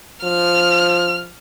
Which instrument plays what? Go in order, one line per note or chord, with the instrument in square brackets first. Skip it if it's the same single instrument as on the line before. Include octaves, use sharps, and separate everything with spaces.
[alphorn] F3 [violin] F6